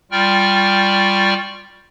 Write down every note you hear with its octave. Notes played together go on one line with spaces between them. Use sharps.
G3 F4 D5 G5 C#6 F6